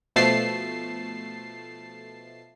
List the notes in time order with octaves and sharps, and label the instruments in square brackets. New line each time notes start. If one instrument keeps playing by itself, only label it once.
[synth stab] B2 F3 A3 A5 C7